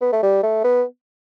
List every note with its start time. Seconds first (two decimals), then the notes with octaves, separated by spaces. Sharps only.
0.01 B3
0.13 A3
0.23 G3
0.43 A3
0.64 B3